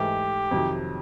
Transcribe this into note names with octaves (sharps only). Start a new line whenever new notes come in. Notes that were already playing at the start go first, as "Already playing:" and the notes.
Already playing: G#2 E3 A3 G4
F2 C3 D#3 F#3